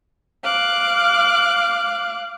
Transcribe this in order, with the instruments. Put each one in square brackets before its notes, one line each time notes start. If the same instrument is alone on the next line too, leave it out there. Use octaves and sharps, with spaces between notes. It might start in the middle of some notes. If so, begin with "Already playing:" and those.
[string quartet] F5 D6 F#6